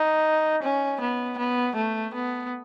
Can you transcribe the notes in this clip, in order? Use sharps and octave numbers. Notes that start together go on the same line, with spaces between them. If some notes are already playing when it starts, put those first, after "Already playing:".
Already playing: D#4
C#4
B3
B3
A3
B3